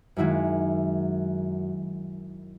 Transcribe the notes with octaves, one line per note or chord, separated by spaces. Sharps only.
F#2 D#3 G#3 E4 F#4